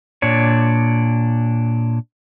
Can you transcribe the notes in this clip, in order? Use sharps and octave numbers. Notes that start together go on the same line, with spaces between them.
A#2 D4 C#5